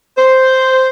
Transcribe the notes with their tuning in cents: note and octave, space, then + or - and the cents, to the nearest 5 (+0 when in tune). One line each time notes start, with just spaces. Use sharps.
C5 -5